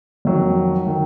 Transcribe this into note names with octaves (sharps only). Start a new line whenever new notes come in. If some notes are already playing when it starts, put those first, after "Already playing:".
F2 D#3 F#3
D#3 F#3